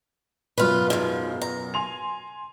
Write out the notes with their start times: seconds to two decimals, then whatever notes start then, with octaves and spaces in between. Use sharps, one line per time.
0.58 F#2 B2 F4 B4
0.90 G#2 F3
1.42 A#5
1.74 G#5 C6 F7